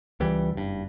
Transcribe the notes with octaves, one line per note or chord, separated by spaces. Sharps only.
C#2 E3 G3
F#1 G2